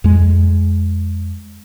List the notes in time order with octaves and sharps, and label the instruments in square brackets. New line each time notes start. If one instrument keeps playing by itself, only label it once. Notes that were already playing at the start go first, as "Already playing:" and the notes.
[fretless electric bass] F2 G#3